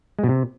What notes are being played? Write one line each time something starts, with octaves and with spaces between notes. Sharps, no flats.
G#3
B2
C3